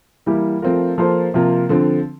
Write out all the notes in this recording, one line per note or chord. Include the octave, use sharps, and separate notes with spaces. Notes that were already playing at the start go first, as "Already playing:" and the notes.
E3 G3 A#3 E4 G4
F3 A3 C4 F4 A#4
F3 A#3 F4 A4 C5
C3 F3 A#3 F4
D3 F3 C4